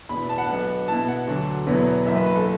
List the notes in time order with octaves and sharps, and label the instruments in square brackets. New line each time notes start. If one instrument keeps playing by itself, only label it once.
[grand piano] E2 B2 B3 E4 [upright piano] B5
[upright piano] A5
F#5
[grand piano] B1 B2 B3 D4 [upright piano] A5
[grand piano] B2 B3 E4 B4 [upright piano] A5
[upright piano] F#5
[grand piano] D2 D3 F#3 D4
E2 B2 F#3 B3 E4
[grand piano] F#1 F#2 E3 [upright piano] E5
[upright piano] B4
B4
A4